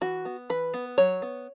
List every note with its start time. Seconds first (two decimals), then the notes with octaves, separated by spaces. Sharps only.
0.01 E3 F#4
0.25 B3
0.50 E3 B4
0.74 B3
0.98 F#3 C#5
1.22 B3